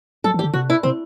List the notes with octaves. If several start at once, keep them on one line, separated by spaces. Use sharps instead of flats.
F#3 A4
E3
G4
D3
C3 F#4
E4
C3 C4